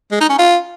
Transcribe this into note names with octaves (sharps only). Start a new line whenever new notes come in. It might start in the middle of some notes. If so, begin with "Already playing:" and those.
G#3
D#4
C#4
F4